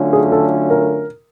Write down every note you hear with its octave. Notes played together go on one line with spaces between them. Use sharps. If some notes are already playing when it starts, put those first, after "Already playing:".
Already playing: D3 F#3 A3 C#4 F4
G#4
A4
A#4